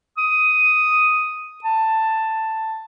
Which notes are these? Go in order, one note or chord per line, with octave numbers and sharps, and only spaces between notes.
D#6
A5